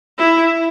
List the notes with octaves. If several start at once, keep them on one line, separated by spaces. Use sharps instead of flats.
E4